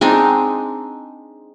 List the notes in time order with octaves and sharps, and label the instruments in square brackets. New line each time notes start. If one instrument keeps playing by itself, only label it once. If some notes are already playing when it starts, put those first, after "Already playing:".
[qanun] G#3 C4 D4 D#4